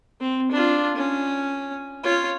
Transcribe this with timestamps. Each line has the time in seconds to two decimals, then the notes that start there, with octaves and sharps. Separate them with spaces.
0.21 C4
0.52 D4 F4
0.96 C#4
2.03 F4 C#5